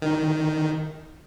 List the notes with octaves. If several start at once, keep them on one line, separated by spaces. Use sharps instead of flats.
D#3